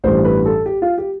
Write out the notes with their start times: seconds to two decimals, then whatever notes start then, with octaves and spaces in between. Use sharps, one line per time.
0.04 A1 G2 E3 G3 C5
0.24 B4
0.46 A4
0.66 G4
0.82 F4
0.98 G4